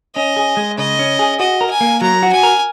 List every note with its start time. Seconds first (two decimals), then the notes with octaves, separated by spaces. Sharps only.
0.15 C#4 D#5
0.37 G#4
0.57 G#3
0.78 C#3 D#5
0.99 C#4
1.19 G#4
1.39 F#4 D#5
1.61 A#4
1.71 G#5
1.81 A#3
2.01 F#3 A#5
2.23 F#4
2.33 G#5
2.43 A#4